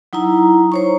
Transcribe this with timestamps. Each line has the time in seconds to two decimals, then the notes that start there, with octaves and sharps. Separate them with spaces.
0.13 F#3 D#4 E4 A#5
0.72 C5 C#5 C#6